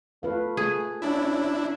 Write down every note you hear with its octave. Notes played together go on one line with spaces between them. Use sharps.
A3 F4 B4 F5
G#4
C#4 D4 E4